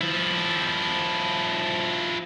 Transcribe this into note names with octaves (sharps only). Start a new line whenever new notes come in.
F3 E4